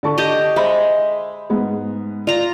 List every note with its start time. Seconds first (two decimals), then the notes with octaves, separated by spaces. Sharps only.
0.03 D3 A5 C#6
0.18 G4 D#5
0.56 G#3 C5 E5 B5
1.50 G#2 B3 G#4
2.27 F4 D5 A#5